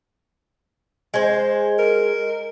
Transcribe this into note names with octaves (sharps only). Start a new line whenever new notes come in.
G#3 C5
A#4